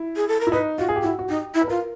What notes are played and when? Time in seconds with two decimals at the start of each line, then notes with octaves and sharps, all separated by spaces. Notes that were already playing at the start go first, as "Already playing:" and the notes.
Already playing: E4
0.16 G#4
0.28 A4
0.41 A#4
0.47 E4
0.52 D#4 B4
0.78 F4 F#4
0.89 G#4
0.96 G4
1.03 E4 F#4
1.19 F#4
1.29 D#4 G4
1.54 E4
1.62 B4
1.68 F4 A#4